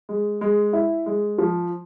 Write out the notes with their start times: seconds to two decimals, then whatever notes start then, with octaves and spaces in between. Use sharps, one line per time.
0.09 G#3
0.41 G#3
0.73 E4
1.06 G#3
1.38 F3